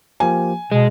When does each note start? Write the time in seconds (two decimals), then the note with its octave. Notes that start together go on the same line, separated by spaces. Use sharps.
0.20 F3 A#3 G4 G#5
0.72 B2 G#3 D#5